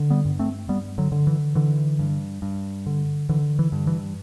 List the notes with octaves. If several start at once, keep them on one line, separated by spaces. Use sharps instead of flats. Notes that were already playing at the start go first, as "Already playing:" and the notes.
Already playing: D3
G3 B3
G2
A3 C4
G2 G3 B3
D3 F#3
D3
E3
D3 E3
G2
G2
D3
D3 E3
E3
G2
E3